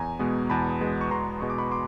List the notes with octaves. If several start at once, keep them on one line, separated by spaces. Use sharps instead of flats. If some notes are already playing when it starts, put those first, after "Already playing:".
Already playing: E2 G#5 A#5
B2 G#3 B3
E2 A5 B5
B2 G#3 B3
C#6
E2 A#5 C6
B2 G#3 B3 C#6
D6
B5 C#6
C6 D6